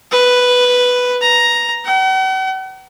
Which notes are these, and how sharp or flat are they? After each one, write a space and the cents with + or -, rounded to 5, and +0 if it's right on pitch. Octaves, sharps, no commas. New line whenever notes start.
B4 +0
A#5 +5
F#5 +45